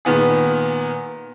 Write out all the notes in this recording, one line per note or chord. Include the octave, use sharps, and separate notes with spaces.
A#2 D#3 B3 G#4